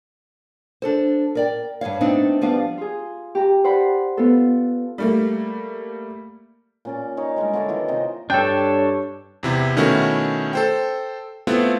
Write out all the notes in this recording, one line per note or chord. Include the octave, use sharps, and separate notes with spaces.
D4 A4 C5
A#4 D5 G5
G2 C#3 C#5 F5
A3 B3 C4 D4 D#4
F3 G3 B3 D4 F5
F4 G#4
G4 A#5
C5 D5 F#5 B5
B3 F4 A4
G3 A3 A#3
A#2 C#4 D5
D#4 C#5 D6
G3 G#3 D4 A#4
D3 D4 C#5 E5
D#3 E3 A#3 F4
C3 D#3 C5 D#5
G2 D4 A4 C#5 G5
E2 C3 E4
B2 D#3 A3 C#4 E4 F#4
A4 C5 G5
A3 B3 C4 E4 F4